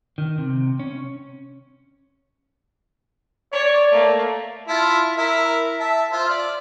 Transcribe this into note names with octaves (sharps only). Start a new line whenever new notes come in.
D#3
C3
C#4
C#5 D5
A3 A#3
E4 F4 A5
E4 A#4 E5
E5 A5
F4 C5 E5
D5